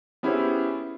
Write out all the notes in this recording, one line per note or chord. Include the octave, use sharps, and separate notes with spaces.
B3 C#4 E4 G4 G#4 C5